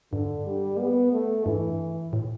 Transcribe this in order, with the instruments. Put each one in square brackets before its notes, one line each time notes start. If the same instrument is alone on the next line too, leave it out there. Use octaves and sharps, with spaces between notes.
[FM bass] G2 [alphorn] D3
[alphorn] G3
B3
A3
[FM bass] G2 [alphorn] E3
[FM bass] A2